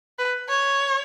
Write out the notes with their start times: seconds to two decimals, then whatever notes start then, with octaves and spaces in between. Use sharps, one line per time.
0.19 B4
0.49 C#5